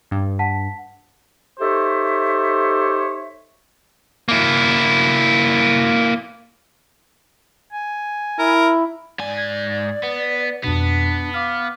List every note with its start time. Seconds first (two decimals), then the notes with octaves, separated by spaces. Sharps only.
0.11 G2
0.39 F#5 A5 B6
1.60 D#4 G4 A4 C5 C#5 E5
4.29 A#3 E4
7.72 G#5
8.39 E4 A#4
9.19 G#2 D5 G#5
9.38 G#6
10.03 B3
10.64 F2 B2 B3 D4
11.34 F5 D6 F6